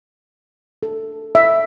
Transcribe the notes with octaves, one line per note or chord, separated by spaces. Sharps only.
A4
E5